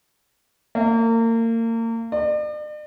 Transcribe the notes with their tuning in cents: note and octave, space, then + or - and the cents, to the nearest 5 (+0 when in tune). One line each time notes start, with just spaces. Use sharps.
A#3 -35
D5 +45